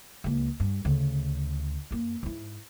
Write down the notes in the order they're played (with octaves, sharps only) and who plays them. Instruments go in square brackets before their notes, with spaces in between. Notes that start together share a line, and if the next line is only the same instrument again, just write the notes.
[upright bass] C#2 A#3
G2
D2 C#3
F#2 A#3
G#2 E4